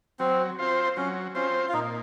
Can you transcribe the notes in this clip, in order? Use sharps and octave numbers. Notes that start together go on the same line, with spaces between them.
F#3 C4
C4 F4 C5
F#3 C#4
C4 C#4 F4 C5
F4
A#2 D#4